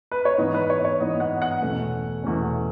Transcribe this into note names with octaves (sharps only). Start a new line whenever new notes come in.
B4
C#5
G#2 E3 B3 D#5
B4
C#5
C#5
G#2 E3 B3 D#5
F#5
F#5
E2 B2 A3 C#4
E2 B2 A3 C#4